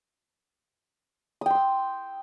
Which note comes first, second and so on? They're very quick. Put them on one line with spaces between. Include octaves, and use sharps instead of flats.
D#6 G5 C6 E6